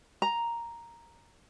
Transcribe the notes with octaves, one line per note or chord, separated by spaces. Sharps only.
A#5